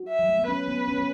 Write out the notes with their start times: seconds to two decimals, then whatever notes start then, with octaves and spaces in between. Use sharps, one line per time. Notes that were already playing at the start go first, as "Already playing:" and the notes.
Already playing: F#4
0.09 E5
0.19 F#3
0.29 A3
0.38 B3
0.48 C#4 B4
0.68 B3
0.88 C#4
0.98 C#4